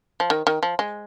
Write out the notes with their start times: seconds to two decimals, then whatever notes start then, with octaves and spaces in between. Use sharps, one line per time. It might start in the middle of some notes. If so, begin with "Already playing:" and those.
0.20 F3
0.30 D#3
0.47 D#3
0.63 F3
0.79 G#3